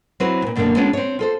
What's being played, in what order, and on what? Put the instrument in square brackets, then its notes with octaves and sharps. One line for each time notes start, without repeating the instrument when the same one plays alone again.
[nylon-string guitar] F#3 C4 E4 F#4 B4
D2 A#2
F#2 B2 D3 A3 A#3 D4
G#3 B3 C#4 D4 F4
C4 C#5
F4 A4 C5